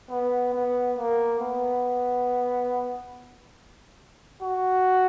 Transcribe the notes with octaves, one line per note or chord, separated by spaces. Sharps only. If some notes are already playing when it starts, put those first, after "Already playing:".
B3
B3
A#3
B3
F#4